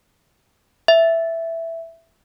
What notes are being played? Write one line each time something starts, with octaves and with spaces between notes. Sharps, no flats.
E5